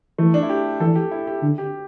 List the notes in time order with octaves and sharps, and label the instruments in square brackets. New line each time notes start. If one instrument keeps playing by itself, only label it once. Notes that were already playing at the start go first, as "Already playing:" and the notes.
[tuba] E3 [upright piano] A3
[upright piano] D4
E4
G4
[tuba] E3 [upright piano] A4
[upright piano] G4
E4
G4
[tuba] D3
[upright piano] G4